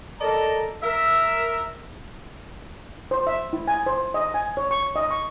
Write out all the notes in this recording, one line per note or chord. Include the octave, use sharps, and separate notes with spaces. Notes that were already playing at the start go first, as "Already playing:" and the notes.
A4 A#4 D5 D#5 A5 A#5
A#4 E5
C5
E5
E4
G#5
C5
D#5
G#5
C#5
C#6
D#5
C#6